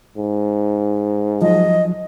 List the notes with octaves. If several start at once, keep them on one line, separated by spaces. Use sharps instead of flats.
G#2
F3 F#3 D#5